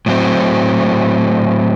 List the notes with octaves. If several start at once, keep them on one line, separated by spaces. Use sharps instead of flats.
A2 F#3 C4